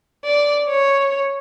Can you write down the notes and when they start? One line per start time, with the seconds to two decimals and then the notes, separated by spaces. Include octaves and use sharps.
0.25 D5
0.68 C#5